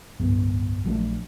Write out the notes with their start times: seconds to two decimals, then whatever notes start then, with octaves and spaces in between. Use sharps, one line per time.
0.19 D1 C2 G2 B3
0.84 A#1 F#3 A3 D4